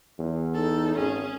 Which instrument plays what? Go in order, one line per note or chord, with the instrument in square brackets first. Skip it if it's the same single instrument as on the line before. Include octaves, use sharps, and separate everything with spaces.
[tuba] E2
[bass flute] D#4 [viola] A4
[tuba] G#1 [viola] C#4 [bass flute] G#4